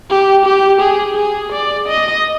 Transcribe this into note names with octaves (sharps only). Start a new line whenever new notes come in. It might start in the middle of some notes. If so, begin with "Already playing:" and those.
G4
G4
G#4
G#4
D5
D#5